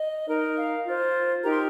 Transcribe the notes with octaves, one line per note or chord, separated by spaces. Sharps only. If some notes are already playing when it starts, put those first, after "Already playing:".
Already playing: D#5
D#4 A#4
F5
F4 C5
D#4 G4 A#4 A#5
C6